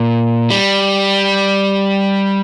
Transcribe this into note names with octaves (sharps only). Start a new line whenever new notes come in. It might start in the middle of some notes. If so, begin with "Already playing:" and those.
Already playing: A#2
G3